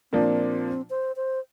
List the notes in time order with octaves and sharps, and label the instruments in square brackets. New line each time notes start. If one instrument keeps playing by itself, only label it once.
[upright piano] A#2 F3 A#3 D4 [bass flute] C4
[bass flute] C5
C5